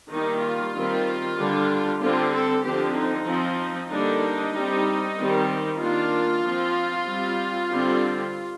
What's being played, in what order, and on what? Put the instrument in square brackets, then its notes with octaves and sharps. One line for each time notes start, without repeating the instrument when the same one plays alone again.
[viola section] D#3 G3 A#3 D#4
F4
D#3 G3 C4
D3 G3 D4
D3 G3 C4 F4
A4
D3 F3 C4 G4
D#4
F3 C4
D3 G3 A#3 D4 D#4
G3 C4
D#3 G3 C4
D#3 A#3 D4 F4
F3 C4
G3 C4
D3 G3 C4